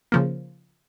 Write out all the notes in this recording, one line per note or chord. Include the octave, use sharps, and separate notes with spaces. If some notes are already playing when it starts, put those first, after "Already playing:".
C#3 F3 A#3